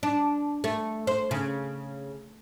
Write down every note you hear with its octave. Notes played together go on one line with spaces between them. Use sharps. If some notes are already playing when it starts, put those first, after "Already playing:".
D4
A3
C5
C#3